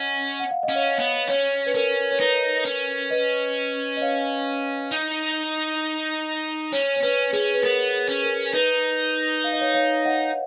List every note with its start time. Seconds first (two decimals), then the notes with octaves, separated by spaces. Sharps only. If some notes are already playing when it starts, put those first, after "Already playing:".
Already playing: C#4 D#5 F#5
0.40 F#5
0.51 F5
0.63 D#5
0.69 C#4
0.75 C#5 F5
0.99 B3
1.29 C#4 C#5
1.66 B4
1.75 C#4 A#4
2.11 C#5
2.20 D#4 B4
2.65 C#4
3.10 B4 D#5
3.97 D#5
4.01 C#5 F5
4.92 D#4
6.72 C#4 C#5
6.96 C#5
7.03 C#4 B4
7.33 C#4 G#4
7.54 B4
7.63 B3 A#4
7.94 G#4
8.08 C#4
8.23 A#4
8.54 D#4 B4
9.44 F5
9.53 D#5
9.61 C#5 F5
9.74 C#5 F5
10.05 D#5 F#5